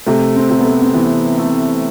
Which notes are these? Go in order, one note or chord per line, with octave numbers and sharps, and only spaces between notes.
C3 A3
C4
C3
B3
A3
C4
E3 B3
A3